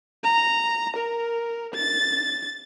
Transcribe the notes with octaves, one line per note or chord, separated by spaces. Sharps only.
A#5
A#4
A6